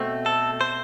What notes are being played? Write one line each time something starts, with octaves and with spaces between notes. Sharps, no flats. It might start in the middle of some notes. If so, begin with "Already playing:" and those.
Already playing: B2 A3 C4
A4
C5